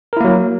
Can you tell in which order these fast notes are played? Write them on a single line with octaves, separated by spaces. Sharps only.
A#4 E4 A#3 F#3